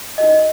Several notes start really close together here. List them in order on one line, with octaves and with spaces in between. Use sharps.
D#5 F#4 D#4